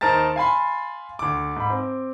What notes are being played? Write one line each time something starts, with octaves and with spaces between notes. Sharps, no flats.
D#2 D#4 A#4 C5 A5 A6
F5 G#5 B5 C6
D2 D6
G#2 B5
C4